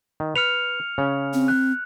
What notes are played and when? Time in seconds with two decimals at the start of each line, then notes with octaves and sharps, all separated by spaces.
0.20 D#3
0.36 B4 F6 C#7 F7
0.98 C#3 C#4
1.33 C4
1.48 F#6